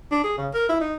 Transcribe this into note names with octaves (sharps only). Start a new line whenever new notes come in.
D4
G#4
C#3
A#4
E4
D#4